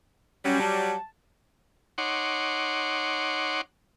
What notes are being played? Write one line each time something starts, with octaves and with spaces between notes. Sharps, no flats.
F#3 G3 C#4
A5
D#4 C#5 F#5 C6 D6